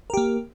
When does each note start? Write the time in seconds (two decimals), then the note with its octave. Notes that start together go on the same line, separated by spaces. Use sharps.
0.10 A#4
0.14 G4
0.17 A#3